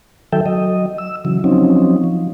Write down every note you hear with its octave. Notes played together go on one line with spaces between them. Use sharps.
D#3 F#3 A4 E5 G5
F#3 D#5
E6
C#3 E3 F#3
F3 F#3 C4 C#4 D#4
F3